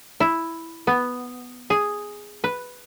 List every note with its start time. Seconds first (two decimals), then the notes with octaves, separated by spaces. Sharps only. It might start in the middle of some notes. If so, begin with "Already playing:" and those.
0.20 E4
0.87 B3
1.70 G#4
2.44 B4